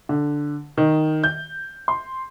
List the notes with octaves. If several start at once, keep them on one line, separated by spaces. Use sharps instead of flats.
D3
D#3
G6
C6